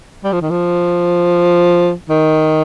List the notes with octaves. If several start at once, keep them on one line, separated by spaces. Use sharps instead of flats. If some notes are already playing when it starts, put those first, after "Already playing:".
G3
F3
D#3
F3
D#3